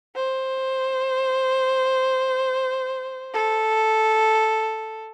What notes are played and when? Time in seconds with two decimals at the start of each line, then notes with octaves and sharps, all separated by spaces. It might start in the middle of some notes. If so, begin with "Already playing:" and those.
0.16 C5
3.34 A4